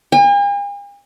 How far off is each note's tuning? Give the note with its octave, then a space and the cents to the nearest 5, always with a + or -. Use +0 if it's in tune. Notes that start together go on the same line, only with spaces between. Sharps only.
G#5 -45